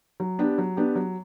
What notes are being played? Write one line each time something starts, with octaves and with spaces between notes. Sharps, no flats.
F#3
B3 D4 G4
F#3
B3 D4 G4
F#3